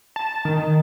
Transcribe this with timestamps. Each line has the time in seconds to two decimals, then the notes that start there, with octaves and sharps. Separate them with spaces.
0.16 A5
0.45 D#3